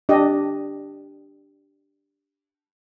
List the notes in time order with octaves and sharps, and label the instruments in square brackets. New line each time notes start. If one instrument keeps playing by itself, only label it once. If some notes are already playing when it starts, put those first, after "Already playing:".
[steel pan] D4 G4 D#5